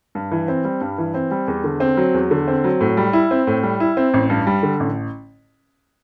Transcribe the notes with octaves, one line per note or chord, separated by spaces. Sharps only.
G2
E3
C4
G3
G2
E3
C4
G3
E2
D3
C4
F#3
E2
D3
C4
F#3
A2
G3
E4
C4
A2
G3
E4
C4
A1
G2
G3
D3
A1